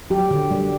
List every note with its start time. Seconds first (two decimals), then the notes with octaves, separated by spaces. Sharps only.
0.10 F#3 G4
0.31 D3
0.51 G3